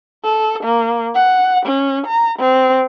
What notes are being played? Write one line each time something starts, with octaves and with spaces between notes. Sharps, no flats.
A4
A#3
F#5
C#4
A#5
C4